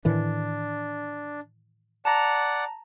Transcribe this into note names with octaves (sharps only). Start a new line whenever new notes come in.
A2 D#3 E3 D4
D5 F#5 A5 A#5